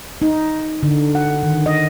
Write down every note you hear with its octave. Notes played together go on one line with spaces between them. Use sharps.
D#4
D3
F#5
D#3
D#5